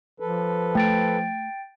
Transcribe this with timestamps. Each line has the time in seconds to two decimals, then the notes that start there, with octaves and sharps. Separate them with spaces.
0.20 F3 A4 B4
0.75 A3 G5 A6 D7